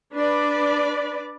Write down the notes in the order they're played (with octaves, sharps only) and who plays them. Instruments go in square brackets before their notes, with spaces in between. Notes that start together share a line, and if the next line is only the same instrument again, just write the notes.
[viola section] D4 B4 D5